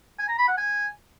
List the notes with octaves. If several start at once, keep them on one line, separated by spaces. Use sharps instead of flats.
G#5
A#5
B5
F#5
G#5